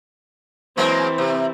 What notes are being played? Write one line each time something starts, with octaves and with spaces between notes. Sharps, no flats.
E3 F#3 G#3 A#3 C4 C5
C3